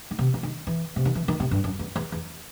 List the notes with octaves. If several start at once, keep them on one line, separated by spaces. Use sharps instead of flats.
D#3
C3
E3
D#3
E3
C3
D#3
E3
D#3
C3
G2
F#2
E2
E2
E2